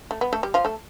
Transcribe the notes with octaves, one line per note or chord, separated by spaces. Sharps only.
A3
B3
A3 A4
G3 G4
F3 F4
A3 A4